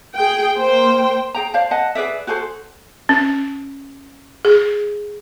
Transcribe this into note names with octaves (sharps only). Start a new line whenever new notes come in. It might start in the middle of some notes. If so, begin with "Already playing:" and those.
G#4 G5
A#3 C5 G5
G#4 G5 A#5
C5 D5 F5 A5
D#5 F#5 A5
G#4 B4 D5 E5
F#4 G#4 A4 C5
C#4
G#4